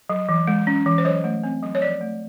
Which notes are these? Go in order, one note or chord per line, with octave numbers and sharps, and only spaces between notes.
F#3
E3
G#3
C#4
E3
C5
F#3 C#5
A3
C4
F#3
C#5
F3 D5
A3